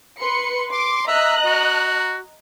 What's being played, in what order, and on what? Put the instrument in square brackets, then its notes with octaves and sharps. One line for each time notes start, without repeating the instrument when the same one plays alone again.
[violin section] B4 C6 C#7
[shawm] C6 [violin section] D6
[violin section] D#5 A#5 F#6 [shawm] E5
[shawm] F#4